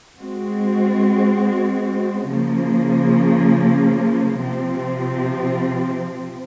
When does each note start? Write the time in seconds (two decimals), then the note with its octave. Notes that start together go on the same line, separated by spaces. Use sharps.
0.19 G#3 C4 F#4
2.30 C#3 F3 A#3
4.43 C3 F3 C4